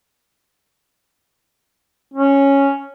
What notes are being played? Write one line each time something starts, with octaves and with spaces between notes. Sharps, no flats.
C#4